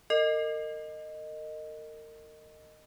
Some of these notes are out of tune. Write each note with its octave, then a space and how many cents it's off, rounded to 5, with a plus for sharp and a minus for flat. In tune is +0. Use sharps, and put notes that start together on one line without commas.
A#4 -35 D#5 -10